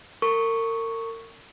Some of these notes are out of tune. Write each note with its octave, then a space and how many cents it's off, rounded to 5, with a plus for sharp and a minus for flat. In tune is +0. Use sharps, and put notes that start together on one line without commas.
A#4 -35 C#6 +0